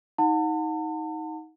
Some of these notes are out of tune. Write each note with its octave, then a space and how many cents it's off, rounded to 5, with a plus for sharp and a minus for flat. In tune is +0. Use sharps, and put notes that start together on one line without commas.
D#4 +25 F#5 -30 A5 +35